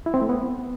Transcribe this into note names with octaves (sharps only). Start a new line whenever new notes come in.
E4
C4
A3
B3